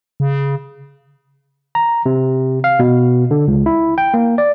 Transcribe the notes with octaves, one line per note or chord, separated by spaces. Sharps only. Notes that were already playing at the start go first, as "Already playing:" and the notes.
C#3
A#5
C3
F5
B2
D3
C#2
E4
G5
A#3
D5